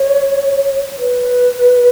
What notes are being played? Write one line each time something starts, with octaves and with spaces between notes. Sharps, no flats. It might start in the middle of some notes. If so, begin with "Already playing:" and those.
Already playing: C#5
B4